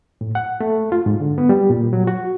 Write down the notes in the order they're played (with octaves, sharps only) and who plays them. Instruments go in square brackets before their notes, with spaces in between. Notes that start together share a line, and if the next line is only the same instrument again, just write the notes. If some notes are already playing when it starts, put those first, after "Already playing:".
[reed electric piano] A2
F#5
A3
F4
G#2
D3
B3
G3
A#2
F#3
F#4